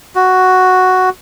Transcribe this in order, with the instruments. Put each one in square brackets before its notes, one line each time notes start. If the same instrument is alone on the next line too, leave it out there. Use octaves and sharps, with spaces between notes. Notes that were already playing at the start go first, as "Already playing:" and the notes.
[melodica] F#4